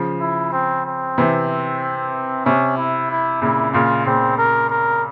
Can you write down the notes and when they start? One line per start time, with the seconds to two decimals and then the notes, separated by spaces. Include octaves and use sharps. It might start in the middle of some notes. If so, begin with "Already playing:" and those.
Already playing: C#3 F3
0.20 E4
0.53 C4
0.85 C4
1.18 C3 E3
2.46 C3 C#4
2.77 E4
3.10 E4
3.41 A#2 C#3 E4
3.73 A#2 C#3 F4
4.06 A#2 C#3 C4
4.38 A#4
4.70 A#4